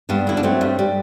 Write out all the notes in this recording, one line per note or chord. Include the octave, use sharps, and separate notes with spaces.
G2 B3 D4
D3 E4
D4
F#3 A3 C4
G2
G3